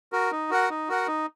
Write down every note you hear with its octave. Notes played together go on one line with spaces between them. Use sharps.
F#4 A#4
D#4
F#4 A#4 F#5
D#4
F#4 A#4 F#5
D#4